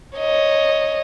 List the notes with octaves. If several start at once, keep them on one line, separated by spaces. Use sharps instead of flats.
C#5 D#5